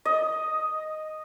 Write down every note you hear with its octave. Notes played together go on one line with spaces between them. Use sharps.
D#5